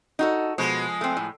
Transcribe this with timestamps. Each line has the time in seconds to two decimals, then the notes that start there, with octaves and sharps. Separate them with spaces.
0.19 D#4 F#4 A4
0.58 B2 F3 G#3
1.01 A3 C4
1.17 A2